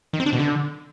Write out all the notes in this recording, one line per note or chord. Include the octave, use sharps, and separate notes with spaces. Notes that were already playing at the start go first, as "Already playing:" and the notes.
D#3
C4
D4
B2
D3